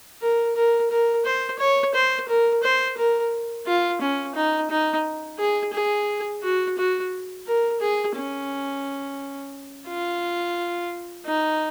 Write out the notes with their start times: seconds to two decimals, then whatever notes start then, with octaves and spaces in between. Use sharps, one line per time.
0.22 A#4
0.56 A#4
0.90 A#4
1.25 C5
1.59 C#5
1.95 C5
2.29 A#4
2.63 C5
2.98 A#4
3.67 F4
4.02 C#4
4.35 D#4
4.71 D#4
5.39 G#4
5.74 G#4
6.44 F#4
6.78 F#4
7.47 A#4
7.81 G#4
8.16 C#4
9.88 F4
11.26 D#4